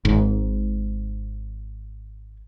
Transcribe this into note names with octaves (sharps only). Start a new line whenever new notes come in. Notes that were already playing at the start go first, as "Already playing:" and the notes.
G#1 G#2